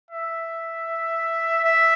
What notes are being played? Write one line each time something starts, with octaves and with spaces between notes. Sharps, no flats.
E5
E5